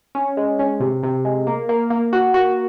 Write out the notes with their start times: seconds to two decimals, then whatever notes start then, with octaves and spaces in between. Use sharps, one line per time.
0.15 C#4
0.37 G#3
0.59 C#4
0.80 C3
1.03 C3
1.25 G#3
1.47 A#3
1.69 A#3
1.90 A#3
2.13 F#4
2.34 F#4